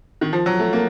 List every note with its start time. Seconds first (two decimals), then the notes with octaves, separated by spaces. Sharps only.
0.21 D#3
0.33 F3
0.46 F#3
0.59 A3
0.73 A#3